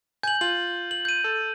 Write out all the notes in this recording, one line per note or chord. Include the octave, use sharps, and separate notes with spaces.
G#5 G6 F#7
F4 F#7
F#7
G6 D#7
A4